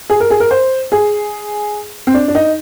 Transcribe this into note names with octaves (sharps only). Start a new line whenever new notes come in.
G#4
A#4
G#4
A#4
C5
G#4
C4
D4
D4
D#4